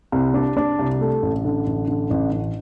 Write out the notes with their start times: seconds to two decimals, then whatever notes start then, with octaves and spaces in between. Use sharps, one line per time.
0.12 C2
0.34 D4
0.57 D4
0.79 C2
1.01 A3
1.23 A1
1.45 D3
1.67 A1
1.88 D3
2.10 A1
2.32 A1